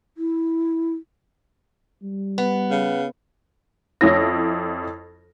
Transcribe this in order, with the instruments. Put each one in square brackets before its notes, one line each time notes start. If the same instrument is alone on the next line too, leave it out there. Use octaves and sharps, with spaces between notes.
[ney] E4
[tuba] G3
[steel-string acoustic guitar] B3
[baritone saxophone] C#3
[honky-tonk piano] F2 C#4 E4 A#6